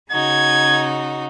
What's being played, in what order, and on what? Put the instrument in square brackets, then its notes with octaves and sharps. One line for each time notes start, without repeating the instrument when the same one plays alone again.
[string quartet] C#3 D#4 F#4 [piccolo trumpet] G#6